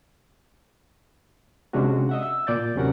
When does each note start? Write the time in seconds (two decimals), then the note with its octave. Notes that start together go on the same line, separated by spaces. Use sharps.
1.73 C3 G#3 C#4 D4 F#4
2.09 D#5 E5 F#5
2.23 E6
2.47 A#2 D5 G6 A6
2.76 D#2 C3 F#3 C#4 A#4 F#5